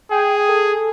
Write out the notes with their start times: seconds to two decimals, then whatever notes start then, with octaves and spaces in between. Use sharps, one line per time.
0.11 G#4 G5
0.49 A4